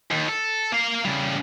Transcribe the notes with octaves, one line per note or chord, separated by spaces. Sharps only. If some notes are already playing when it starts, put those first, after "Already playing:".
D#2
A4
A#3 F5
C#3 G3